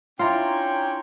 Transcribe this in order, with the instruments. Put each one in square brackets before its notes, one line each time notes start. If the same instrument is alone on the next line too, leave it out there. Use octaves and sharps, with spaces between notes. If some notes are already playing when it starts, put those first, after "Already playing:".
[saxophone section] C#4 D4 C#5 [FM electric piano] E4 A#5 C6 [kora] F4 [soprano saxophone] G5